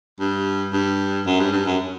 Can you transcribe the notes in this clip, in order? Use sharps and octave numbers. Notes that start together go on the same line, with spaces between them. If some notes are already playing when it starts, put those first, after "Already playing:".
G2
G2
F#2
G2
G2
F#2